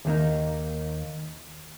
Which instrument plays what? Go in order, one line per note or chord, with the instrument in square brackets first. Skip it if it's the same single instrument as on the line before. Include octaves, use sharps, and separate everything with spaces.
[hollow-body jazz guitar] D#2 D#3 A#3 D#4